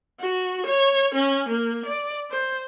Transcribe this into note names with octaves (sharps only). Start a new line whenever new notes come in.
F#4
C#5
C#4
A#3
D5
C5